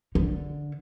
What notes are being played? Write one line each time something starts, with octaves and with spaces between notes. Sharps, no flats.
D3